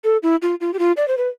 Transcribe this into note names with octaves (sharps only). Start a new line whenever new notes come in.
A4
E4
F4
F4
G4
F4
D5
C5
B4